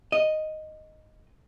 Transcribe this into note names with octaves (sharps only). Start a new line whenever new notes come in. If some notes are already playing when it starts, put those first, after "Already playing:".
D#5